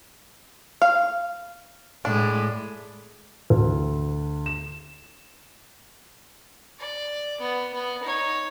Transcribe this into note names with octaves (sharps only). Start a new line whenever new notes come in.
F5
A2 G#3 D4
D2
E7
D5
B3
B3
D#4 C#5